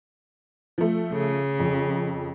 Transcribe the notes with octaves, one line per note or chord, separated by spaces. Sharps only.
F3 A3
C#3
F2